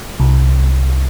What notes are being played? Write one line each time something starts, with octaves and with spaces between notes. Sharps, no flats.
C2